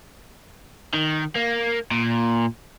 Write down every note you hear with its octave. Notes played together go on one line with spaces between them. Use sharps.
D#3
A#3
A#2